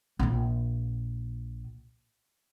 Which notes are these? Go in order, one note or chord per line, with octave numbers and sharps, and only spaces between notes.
A#1 F4